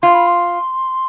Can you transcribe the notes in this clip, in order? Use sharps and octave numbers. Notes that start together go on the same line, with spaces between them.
F4 C6
B5
C6